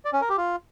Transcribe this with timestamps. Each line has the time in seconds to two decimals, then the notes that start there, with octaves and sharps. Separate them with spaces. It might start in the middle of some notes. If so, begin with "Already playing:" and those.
0.05 D5
0.13 C#4
0.21 A#4
0.30 G4
0.38 F4